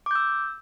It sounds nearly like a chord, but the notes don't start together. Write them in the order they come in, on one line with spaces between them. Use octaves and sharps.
D6 G6 E6